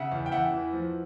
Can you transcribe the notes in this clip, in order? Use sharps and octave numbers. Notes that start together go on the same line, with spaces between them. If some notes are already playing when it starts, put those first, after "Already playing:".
Already playing: C#3 E5 F#5
E2
G5
E2 E5 F#5
E3
F3